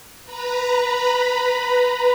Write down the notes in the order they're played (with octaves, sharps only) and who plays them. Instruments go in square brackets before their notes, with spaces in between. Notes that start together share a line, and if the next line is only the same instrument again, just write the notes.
[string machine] B4 A#5 B5